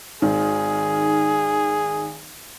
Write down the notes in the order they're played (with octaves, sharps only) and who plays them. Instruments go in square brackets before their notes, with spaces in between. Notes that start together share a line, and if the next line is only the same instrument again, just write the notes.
[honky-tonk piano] G#1 D#3 [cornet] G#4